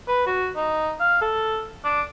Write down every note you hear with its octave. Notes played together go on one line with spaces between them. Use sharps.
B4
F#4
D#4
F5
A4
D4